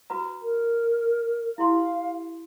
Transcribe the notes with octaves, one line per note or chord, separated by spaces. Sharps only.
F#4 B4 A#5
A#4
E4 G4 F5 C6